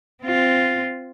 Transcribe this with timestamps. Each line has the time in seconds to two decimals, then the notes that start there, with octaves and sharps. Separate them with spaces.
0.24 C4 F4